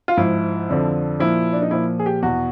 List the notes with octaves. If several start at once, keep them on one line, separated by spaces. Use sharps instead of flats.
F4
G#2 F3 E4
F2 D3 F3
A#2 F3 E4
D4
D#4
A#2 F3 E4
G#4
G4
E2 B2 F#4